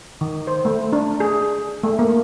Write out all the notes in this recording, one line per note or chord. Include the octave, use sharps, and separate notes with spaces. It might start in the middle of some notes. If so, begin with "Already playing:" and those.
D#3
C5
A3
D4
G#4
A3
A#3